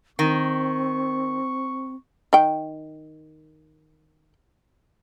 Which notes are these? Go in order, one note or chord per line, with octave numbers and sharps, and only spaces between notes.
D#3 C4 C#6
D#3 G5